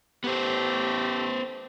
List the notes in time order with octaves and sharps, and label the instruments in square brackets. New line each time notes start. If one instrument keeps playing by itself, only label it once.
[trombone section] A1 A3 G4 [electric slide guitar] B3 C5